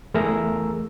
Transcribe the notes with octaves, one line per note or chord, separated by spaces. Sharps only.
E2 A3 G#4 A#4 A#5 E6